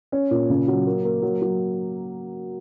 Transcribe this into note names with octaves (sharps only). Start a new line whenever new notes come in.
C#4
A#2
C#3
F#3
A#3
A#3
F#3
F#3